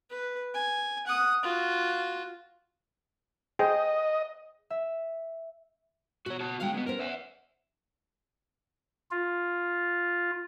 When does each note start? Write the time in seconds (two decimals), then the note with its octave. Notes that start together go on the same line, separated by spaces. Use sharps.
0.10 B4
0.54 G#5
1.07 F#5 D#6
1.43 F4 F#4
3.59 G#4 C5 D#5 G5
4.70 E5
6.26 B2 F#4 C#5
6.41 F#4 A5
6.60 D3 F#3 G#3 F5 G5
6.75 B2 B3
6.87 B3 C#4 A#4 C5
7.01 E5 F#5
9.11 F4